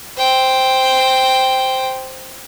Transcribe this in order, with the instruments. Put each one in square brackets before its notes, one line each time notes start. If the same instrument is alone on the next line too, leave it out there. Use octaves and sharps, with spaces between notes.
[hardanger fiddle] C5 G5